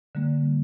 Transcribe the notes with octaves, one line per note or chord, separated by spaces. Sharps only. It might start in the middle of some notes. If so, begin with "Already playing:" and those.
D3 G3 A#3